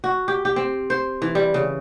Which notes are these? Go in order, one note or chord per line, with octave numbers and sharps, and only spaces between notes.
F#4
G4
G4
C4
C5
E3
G3
C#3